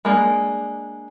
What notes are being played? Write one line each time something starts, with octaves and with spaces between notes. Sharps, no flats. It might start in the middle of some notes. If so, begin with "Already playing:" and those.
G#3 A#3 D4